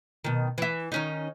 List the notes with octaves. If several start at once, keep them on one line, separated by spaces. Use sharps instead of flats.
B2 D#3
E3 E5
D#3 C#4 D#4